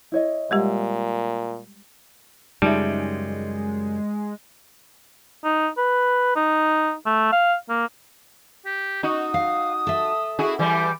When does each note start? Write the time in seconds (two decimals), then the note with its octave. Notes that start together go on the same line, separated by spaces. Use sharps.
0.12 E4 C#5 D#5
0.51 A#2 G3 G#3 G4
2.62 F#2 C#3 G3 G#3 D#4 F4 E5
5.44 D#4
5.78 B4
6.36 D#4
7.06 A3
7.32 F5
7.69 A#3
8.66 G4
9.03 D#4 F#4 D#6
9.34 F5
9.87 A4 E5
10.39 E4 F#4 G#4
10.59 E3 G3 D6